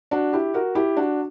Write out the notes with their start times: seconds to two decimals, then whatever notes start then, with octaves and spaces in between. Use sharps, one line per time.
0.11 D4 F#4
0.33 E4 G4
0.54 F#4 A#4
0.75 E4 G4
0.97 D4 F#4